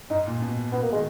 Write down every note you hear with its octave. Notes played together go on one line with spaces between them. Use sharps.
G#2 D#4
A#2
B2
B2 B3
A#3
D#3 G#3